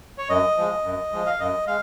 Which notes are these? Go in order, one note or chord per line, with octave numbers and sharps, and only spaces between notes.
C#5
F#2 D#5
F3 G#3
F#2
F3 G#3
F5
F#2 D#5
G#3 F5